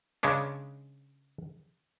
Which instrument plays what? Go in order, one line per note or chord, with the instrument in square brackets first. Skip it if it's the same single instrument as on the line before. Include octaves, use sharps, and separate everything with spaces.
[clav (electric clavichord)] C#3 G#3 C#4 D4